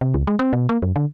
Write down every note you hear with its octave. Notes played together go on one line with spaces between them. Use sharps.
C3
C#2
G#3
C4
B2
A#3
F#2
D3